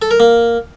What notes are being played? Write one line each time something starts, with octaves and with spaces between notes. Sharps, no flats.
A4
A#4
A#3